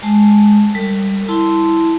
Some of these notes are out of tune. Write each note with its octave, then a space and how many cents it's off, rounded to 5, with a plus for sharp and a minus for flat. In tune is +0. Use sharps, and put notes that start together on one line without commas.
G#3 +0 A5 +0
G3 +0 A#4 -45
E4 +0 A5 +0 C6 -15